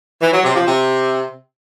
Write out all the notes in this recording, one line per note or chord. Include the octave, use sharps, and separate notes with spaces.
E3
F#3
C3
F3
C3